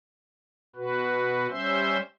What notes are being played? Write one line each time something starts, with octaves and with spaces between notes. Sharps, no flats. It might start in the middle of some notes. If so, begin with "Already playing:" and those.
B2 F#4 B4
G3 C#4 C5 E5 C6